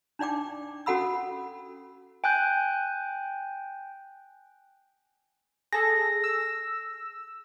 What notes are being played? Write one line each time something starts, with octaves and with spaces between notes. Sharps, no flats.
D4 D#4 D5 G5 D6
C#4 F#4 A4 F#5 B5 E6
G5 G#5 F#6 G6
G#4 A4 A#6
E6